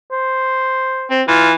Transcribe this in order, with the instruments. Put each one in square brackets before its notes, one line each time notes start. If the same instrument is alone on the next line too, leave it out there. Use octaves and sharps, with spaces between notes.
[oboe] C5
[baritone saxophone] C4
[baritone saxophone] E3 [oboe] F4